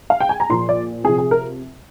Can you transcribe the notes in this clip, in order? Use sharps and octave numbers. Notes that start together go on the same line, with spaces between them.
F5
G5
G#5
A#5
A#2 F3 C6
D5
C3 F3 G#4
G#4
A#4